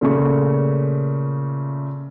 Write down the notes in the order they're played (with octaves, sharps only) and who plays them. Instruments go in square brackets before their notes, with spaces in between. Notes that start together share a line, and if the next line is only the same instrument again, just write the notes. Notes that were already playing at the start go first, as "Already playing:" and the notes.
[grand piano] A#2 C#3 A3 C#6